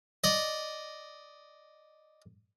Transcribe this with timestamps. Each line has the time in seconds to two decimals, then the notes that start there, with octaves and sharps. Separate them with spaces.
0.24 D5 D#5